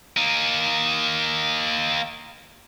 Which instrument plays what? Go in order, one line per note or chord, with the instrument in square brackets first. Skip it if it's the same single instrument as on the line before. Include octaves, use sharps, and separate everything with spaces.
[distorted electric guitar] A#3 D#4